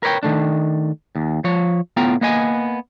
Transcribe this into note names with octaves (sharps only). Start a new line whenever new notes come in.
A#4 B4 C#5 D5 G5
D#3 A3 D4
D#2
F3 C#5
A2 B3 F4 G5 A#5
A#3 B3 D#5 G#5